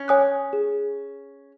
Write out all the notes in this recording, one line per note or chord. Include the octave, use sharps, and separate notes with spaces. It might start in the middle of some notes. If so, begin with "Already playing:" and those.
Already playing: C#4
C#5 G#5 D#6 F#6
G#4